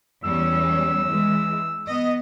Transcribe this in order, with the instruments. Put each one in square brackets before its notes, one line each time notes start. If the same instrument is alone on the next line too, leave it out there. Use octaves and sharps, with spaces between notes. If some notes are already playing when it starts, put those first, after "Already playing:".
[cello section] E2 G3 C#4 [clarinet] E6
[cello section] E3 G#3
B3 D#5